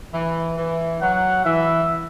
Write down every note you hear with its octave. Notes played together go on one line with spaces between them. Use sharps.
E3
E3
F#3 F#5
E3 E5